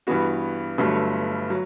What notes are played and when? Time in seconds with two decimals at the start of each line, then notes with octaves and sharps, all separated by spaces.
0.07 G2 E3 B3 F#4
0.78 G1 G2 F#3 A3
1.50 F#3